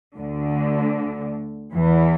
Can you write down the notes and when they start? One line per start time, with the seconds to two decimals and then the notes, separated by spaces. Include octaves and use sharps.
0.17 D2 D3
1.73 E2 E3